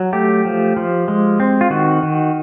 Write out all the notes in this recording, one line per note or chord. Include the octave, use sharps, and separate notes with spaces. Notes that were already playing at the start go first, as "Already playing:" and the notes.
Already playing: F#3
A3 G4
F3
F3
G#3
C4
F4
D#3 F#4
D#3